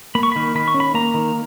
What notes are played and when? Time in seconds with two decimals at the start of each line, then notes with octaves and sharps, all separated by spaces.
0.15 A#3 B5
0.23 C#6
0.32 D#3 B5
0.55 D#3 B5
0.68 C#6
0.74 C#4
0.80 B5
0.94 A#3 A#5
1.14 D#3